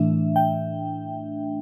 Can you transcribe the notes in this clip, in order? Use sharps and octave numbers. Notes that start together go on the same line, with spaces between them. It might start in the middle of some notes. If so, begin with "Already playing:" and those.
Already playing: A2 E3 A3 D4 E5
G5